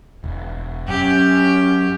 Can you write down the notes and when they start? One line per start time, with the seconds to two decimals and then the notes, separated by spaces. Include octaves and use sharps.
0.24 E1
0.88 F#2 C#4 G4